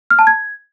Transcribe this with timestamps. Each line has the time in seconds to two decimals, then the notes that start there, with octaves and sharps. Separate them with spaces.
0.10 F6
0.19 A5
0.27 G#6